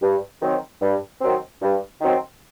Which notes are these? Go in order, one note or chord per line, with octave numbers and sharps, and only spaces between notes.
G2
D#3 F#3 C4
G2
D#3 F#3 C4
G2
D#3 F#3 C4